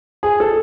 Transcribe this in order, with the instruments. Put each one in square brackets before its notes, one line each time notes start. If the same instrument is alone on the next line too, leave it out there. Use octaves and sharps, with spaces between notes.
[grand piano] G#4
A4